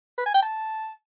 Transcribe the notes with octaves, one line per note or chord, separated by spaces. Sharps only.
B4
G#5
G5
A5